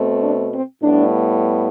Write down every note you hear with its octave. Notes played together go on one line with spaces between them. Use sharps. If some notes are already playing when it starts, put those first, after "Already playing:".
Already playing: B2 A3 C4
D4
C4
A2 G3 B3 D4